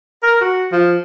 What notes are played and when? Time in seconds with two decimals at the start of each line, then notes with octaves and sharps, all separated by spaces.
0.23 A#4
0.41 F#4
0.72 F3